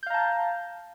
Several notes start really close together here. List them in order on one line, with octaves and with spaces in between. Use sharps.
G6 F5 A#5 A5